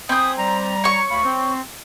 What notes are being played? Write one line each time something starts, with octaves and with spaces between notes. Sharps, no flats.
C4 G#5 B5 D#6 G6
G3 A#5
C#5 C#6
D2 F5 B5
C4